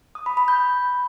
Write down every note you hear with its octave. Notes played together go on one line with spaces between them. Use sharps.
D#6
B5
B5
G6